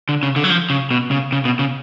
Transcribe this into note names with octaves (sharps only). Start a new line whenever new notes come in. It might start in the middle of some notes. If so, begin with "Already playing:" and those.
D3
C#3
D3
F#3
F3
C#3
B2
C#3
C#3
B2
C#3